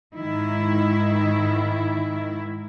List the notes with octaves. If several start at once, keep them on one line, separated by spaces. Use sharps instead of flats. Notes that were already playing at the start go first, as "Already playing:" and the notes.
G#2 D#3 E4